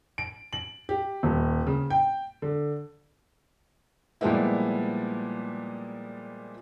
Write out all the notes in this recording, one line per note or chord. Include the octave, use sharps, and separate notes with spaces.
D7
F#7
G4
D#1
C#3
G5
D3
A#2 F3 G3 G#3 B3 E4